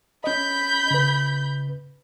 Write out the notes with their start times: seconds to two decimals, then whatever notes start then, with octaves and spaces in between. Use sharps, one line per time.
0.24 C#4 D#5 B5 G6
0.91 C#3 B4